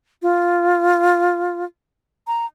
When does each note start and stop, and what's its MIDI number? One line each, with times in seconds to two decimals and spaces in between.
0.22 1.64 65
2.27 2.46 82